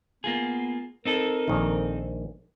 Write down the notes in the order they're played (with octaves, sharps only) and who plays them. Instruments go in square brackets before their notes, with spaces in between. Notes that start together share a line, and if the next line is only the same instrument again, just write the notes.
[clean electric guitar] A#3 F4 G#4 [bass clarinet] B3
[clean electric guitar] C4 D#4 A4 [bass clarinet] A#4
[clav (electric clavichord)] A#1 D#3